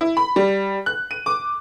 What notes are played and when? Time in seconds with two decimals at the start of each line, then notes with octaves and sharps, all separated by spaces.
0.01 E4
0.17 B5
0.36 G3
0.86 F#6
1.11 D#7
1.26 D6